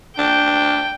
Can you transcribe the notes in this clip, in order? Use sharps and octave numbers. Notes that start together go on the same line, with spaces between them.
D4 G5